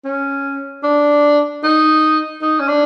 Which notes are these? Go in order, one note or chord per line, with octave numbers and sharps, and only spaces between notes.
C#4
D4
D#4
D#4
C#4
D4